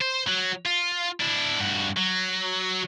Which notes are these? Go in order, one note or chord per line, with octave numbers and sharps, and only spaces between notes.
C5
F#3
F4
D4 E4
G2 F#4
F#3